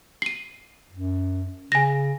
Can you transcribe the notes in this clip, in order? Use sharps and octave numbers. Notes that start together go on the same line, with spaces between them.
C7 D#7
F#2
C#3 G#5 A#6